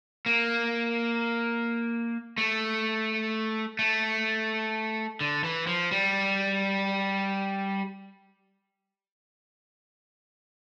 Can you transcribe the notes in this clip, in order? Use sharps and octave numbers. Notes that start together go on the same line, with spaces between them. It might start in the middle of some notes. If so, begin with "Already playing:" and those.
A#3
A3
A3
D3
E3
F3
G3